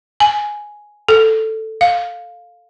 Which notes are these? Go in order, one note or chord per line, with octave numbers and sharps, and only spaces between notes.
G#5
A4
F5